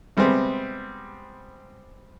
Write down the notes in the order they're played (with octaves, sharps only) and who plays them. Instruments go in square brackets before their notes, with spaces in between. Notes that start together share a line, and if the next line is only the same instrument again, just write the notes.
[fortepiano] C3 G3 G#3 B3 C4